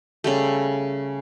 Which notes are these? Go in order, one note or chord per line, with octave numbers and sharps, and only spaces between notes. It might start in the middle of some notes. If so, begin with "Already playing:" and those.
C#3 G3 A3